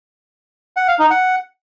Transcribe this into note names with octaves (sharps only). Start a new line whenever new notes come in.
F#5
F5
D#4
F#5